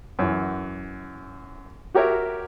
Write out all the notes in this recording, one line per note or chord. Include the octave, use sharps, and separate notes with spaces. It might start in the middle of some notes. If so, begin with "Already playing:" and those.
F#2 E3
F#4 G4 A#4 C#5 E5